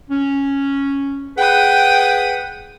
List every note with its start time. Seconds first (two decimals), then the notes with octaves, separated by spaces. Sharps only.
0.10 C#4
1.38 G#4 B4 F#5 G5 D#6